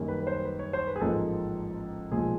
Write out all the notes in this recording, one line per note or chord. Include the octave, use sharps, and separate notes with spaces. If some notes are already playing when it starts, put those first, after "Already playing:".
Already playing: F#2 D#3 G3 A#3
B4
B4
C5
B4
C#5
C5
B4
G#4
A1 G#2 F3 A#3 A4
B1 A#2 F3 G#3 G#4